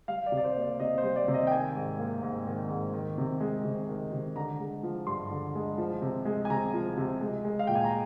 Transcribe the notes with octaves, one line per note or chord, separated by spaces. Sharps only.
G3 F5
D5
C3
D5
C5
A#3
D5
C3 D#5
C5
G3
D5
C3
D#5
G5
D#3 G#5
G#2
A#3
G#2
D#3
G#2
D#3
C3
G#3
C3
D#3
C3
D3 A#5
G#3
F3
G2 C6
D3
G#3
F3
C3
G#3
G#5
C3 A#5
F3
C3
G#3
G#3
F5
A#2 G5
G#5
A#5